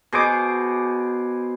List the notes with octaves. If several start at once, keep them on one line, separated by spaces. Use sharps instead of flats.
B2 G#4 C5 D6